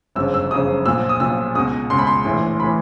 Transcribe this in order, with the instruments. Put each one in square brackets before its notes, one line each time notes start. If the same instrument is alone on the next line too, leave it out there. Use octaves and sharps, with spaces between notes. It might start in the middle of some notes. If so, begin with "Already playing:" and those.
[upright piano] G1 F#2 C#3 F3 E6
E6
G1 F#2 C#3 F3 D#6
B1 A#2 F3 E6
D#6
B1 A#2 F3 E6
C#2 B2 D#6
C#2 B2 C6
B5
C6
A#1 A2 E3
A2 E3 B5